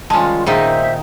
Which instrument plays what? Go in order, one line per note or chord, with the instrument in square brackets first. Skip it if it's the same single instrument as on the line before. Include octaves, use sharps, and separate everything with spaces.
[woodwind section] D#3 G3 F4 [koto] G#3 C#4 [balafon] G#5 A5
[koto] A#2 D#3 D#4 [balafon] G#4 [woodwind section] C5 E5